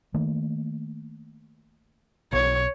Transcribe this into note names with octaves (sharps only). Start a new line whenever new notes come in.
D#3 A3 A#3
B1 B2 C#5